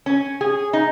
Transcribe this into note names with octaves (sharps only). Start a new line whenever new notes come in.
C#4
G#4
D#4